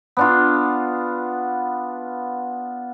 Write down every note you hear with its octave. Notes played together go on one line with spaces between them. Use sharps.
B3 D4 F4